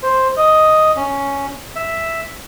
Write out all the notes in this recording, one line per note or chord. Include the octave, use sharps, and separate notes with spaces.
C5
D#5
C#4
E5